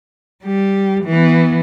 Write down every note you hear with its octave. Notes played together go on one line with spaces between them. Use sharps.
G3 G4
E3 B3